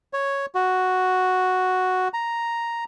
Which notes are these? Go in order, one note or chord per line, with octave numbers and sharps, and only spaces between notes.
C#5
F#4
A#5